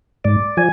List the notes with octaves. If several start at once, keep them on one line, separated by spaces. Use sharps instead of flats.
G#2 D5
F3 G#5